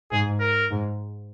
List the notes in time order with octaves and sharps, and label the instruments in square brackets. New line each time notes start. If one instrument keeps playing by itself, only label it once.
[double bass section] G#2 [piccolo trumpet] G#4
[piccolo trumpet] A#4
[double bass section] G#2